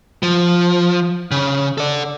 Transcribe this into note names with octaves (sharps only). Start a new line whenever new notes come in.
F3
C#3
A4 D5